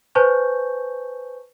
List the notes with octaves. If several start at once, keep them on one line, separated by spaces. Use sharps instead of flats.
B4 C5 G#5 A5 C#6 G6